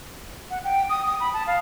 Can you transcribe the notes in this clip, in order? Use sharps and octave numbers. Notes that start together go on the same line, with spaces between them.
F#5
G5
D#6
D#6
B5
A5
F5